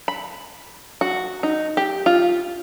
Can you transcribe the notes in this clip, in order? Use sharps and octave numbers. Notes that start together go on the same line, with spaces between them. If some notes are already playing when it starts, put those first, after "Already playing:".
B5
F#4
D#4
G4
F4